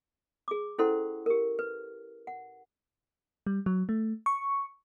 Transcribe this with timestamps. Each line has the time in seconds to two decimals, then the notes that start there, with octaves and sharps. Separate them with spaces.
0.48 G#4 D6
0.78 C#4 E4 A4 C5 F#5 C6
1.26 G4 A#4
1.59 B4
2.27 F#5
3.47 G3
3.66 F#3
3.89 A3
4.26 C#6